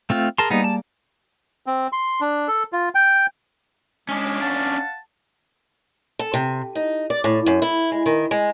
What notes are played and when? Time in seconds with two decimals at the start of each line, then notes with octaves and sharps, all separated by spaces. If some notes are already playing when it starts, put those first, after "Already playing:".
0.10 A3 C4 F4
0.38 G#4 A#4 A5 C6
0.50 G3 A#3 B3 D#4 D5
0.64 A5
1.66 C4
1.92 C6
2.21 D4
2.48 A4
2.72 F4
2.95 G5
4.09 G#3 C#4 D4
4.41 F5 F#5 A5
6.19 A4
6.34 C3
6.75 D#4
7.10 D5
7.24 A2
7.46 F#2
7.62 E4
7.92 G#3
8.06 D#3
8.31 G#3